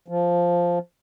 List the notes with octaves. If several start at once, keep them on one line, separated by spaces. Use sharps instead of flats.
F3